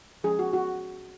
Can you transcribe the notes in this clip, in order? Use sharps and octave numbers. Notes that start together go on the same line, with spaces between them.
F3 G#3 C#4 G#4
F#4
F#4